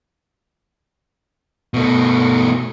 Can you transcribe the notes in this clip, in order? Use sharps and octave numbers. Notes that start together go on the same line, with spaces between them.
B2 A3